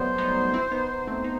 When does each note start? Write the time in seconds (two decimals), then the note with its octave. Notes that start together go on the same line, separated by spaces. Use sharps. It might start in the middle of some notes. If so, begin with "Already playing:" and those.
Already playing: F#3 G3 A3 B3 C5
0.18 B3 D#4
0.54 C4 E4
0.71 B3 D#4
1.07 A3 C4
1.24 D#4